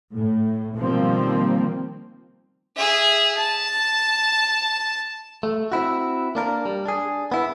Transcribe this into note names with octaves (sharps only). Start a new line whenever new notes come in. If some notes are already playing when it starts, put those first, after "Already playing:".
A2
B2 D#3 F3 G3 A#3 C4
G#4 E5
A5
A3
C4 E4 F#4
A#3 D4 A#4
G3
D4 G#4
B3 E4